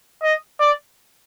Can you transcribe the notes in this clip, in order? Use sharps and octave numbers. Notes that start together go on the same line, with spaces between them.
D#5
D5